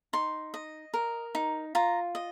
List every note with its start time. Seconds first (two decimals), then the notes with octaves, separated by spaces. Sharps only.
0.13 D#4 C6
0.54 D#5
0.94 A#4
1.35 D#4
1.75 F4 A#5
2.15 D#5